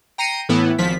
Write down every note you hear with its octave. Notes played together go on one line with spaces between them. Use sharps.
G5 A#5 C7 C#7 D#7
A2 E3 B3 E4
G#1 F3 B6